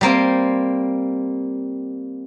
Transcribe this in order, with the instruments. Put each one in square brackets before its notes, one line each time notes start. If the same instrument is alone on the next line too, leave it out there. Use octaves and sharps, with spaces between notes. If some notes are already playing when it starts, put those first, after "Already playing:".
[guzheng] G3 A#3 C4